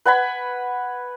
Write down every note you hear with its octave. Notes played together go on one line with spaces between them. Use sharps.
B4 F#5 G#5 B5